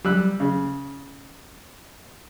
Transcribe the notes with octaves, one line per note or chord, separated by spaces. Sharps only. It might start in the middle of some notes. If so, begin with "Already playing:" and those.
G3 E6 F#6
C#3